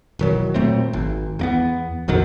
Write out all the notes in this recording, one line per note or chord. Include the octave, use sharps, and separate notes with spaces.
E1 D#3 F#3
A#2 F#3 A3 C4
G#1
E2 A#3 B3
A#1 F2 D#3 F#3